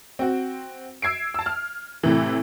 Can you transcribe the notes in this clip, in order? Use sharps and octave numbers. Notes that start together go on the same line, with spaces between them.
C4 F#4
E6 G#6 C7 D7
A5 E6
F6
A2 C3 E3